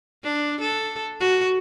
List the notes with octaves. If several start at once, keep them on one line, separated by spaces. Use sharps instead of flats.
D4
A4
F#4